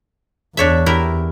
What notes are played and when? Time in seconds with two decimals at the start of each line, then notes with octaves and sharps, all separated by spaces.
0.57 E2 D4 C#5 E5
0.86 E4 G4 A#4